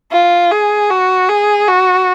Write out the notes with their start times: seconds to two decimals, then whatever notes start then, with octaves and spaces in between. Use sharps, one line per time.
0.12 F4
0.51 G#4
0.90 F#4
1.29 G#4
1.67 F#4